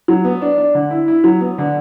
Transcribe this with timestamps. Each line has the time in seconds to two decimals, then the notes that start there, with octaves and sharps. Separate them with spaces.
0.08 F#3
0.25 B3
0.42 D4
0.58 D4
0.75 D3
0.91 E4
1.08 E4
1.24 F#3
1.41 B3
1.58 D3